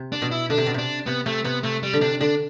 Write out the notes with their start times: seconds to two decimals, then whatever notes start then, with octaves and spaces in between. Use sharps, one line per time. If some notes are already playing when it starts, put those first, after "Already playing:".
Already playing: C3
0.12 D4
0.22 B2
0.31 E4
0.50 D3 D4
0.58 C3
0.66 B2
0.74 C3 D4
1.06 C3 B3
1.26 C3 A3
1.44 C3 B3
1.63 C3 A3
1.83 G3
1.93 D3
2.01 C3 D4
2.21 D3 D4